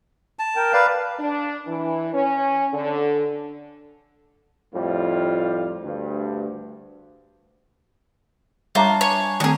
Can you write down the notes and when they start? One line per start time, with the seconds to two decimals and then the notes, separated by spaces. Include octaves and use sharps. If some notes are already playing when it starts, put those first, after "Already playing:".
0.39 A5
0.56 A#4 G5
0.73 B4 D5 F5
1.20 D4
1.67 E3
2.13 C#4
2.73 D3
4.74 F2 A2 G3 F4
5.83 D2 G2
8.75 G3 D4 F4 C#5 E5 F5 A#5
9.01 C#5 G#5
9.40 D#3 A3 C4 F#4 G#4